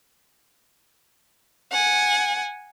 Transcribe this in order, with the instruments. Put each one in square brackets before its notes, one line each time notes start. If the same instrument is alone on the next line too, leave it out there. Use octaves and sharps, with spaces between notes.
[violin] F#5 G#5